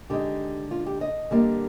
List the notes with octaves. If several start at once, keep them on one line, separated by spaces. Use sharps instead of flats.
D3 G#3 D#4 G4
F4
G4
D#5
D3 G3 A#3